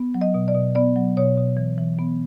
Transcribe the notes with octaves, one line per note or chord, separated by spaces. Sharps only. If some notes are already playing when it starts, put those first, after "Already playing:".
Already playing: B3
F#3
D#5
B2
D5
B2
B3 D5
F#3
B2 C#5
B2
E3
E3
B3